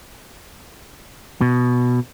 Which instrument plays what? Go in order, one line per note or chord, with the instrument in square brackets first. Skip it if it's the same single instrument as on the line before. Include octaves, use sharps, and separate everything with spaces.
[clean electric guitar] B2